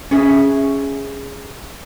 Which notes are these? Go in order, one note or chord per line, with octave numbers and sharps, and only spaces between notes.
C#4 G#4 E5